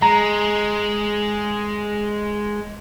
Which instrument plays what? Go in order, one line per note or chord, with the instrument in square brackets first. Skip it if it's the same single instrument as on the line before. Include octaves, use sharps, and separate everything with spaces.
[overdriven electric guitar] G#3 [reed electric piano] A#5